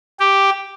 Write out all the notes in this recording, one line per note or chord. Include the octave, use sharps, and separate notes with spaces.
G4